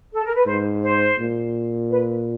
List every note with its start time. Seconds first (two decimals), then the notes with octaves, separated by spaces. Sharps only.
0.12 A4
0.24 A#4
0.35 B4
0.46 G#2 C5
0.83 C5
1.19 A#2
1.90 B4